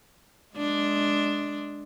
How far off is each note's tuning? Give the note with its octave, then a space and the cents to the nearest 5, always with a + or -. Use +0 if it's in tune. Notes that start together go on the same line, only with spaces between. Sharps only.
G#3 +15 D4 +0